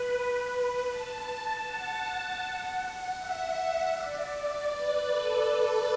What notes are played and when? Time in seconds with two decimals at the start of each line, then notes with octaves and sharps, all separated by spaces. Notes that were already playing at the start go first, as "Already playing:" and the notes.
Already playing: B4
0.11 B4
0.88 A5
1.64 F#5
2.03 A5
2.41 F#5
3.18 E5
3.94 D5
4.71 B4
5.09 A4